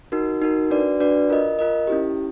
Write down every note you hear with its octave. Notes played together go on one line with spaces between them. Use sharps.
D#4 F#4 A#4
D#4 F#4 A#4
D4 F#4 B4 D5
D4 F#4 B4 D5
F4 A#4 D#5
F4 A#4 D#5
C#4 E4 G4